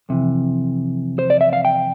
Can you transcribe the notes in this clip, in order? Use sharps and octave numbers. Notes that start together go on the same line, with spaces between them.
F2 C3 E3
C5
D5
E5
F5
G5